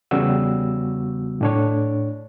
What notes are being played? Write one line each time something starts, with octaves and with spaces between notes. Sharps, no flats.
E2 C#3 G3 B3 F#4 E6
A2 D4 C#5